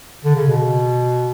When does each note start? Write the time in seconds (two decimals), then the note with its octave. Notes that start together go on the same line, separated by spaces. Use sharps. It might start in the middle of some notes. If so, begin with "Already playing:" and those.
0.25 D3
0.35 C#3
0.48 B2